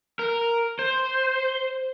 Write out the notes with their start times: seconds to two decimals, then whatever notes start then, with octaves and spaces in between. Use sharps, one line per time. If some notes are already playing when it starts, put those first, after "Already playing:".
0.19 A#4
0.79 C5